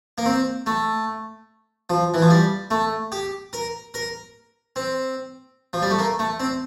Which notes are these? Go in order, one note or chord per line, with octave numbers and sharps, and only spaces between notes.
A#3
C4
A3
F3
E3
F3
G3
A3
G4
A#4
A#4
C4
F3
G3
A3
A#3
A3
C4